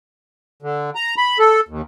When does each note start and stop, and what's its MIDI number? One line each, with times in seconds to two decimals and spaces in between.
0.62 0.90 50
0.95 1.15 82
1.18 1.38 83
1.39 1.60 69
1.68 1.82 39